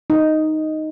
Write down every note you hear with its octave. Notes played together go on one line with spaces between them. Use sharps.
D#4